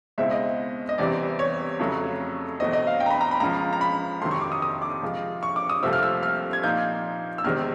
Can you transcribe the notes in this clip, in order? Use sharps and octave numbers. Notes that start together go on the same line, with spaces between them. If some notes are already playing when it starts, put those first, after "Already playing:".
C#2 B2 G#3 C4 E4 E5
D#5
D#5
E2 C3 E3 G3 C4 D5
C#5
F2 C#3 F#3 A3
E2 B2 F#3 A3 C4 D#5
D#5
F5
G5
A#5
B5
A#5
B5
C#2 C#3 F3 A#5
A#5
B5
F2 C3 D#3 F#3 C6
C#6
D6
D#6
D#6
D6
C3 F3 G#3
C#6
D6
D#6
C2 C3 F3 A3 C4 E6
F6
E6
F6
G#6
A#2 F3 A#3 D#4 G6
E6
E2 C3 D#3 G#3 C4 F6